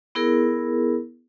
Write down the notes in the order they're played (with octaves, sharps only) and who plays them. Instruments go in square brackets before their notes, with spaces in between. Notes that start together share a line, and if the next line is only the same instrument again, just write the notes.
[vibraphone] B3 E4 G#4 A#4